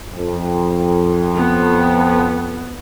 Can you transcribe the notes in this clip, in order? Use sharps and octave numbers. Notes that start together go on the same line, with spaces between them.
F2
B3